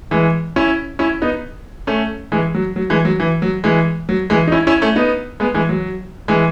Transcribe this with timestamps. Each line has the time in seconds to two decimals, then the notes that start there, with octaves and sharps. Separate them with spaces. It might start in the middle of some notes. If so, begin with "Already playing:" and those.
0.11 E3 G#3
0.56 C#4 E4
0.99 C#4 E4
1.22 B3 D#4
1.87 A3 C#4
2.32 E3 G#3
2.54 F#3
2.76 F#3
2.90 E3 G#3
3.05 F#3
3.20 E3
3.42 F#3
3.64 E3 G#3
4.09 F#3
4.30 E3 G#3
4.47 D#4
4.52 C#4 E4
4.67 C#4 E4
4.82 A3 C#4
4.96 B3 D#4
5.40 G#3 B3
5.54 E3 G#3
5.69 F#3
6.28 E3 G#3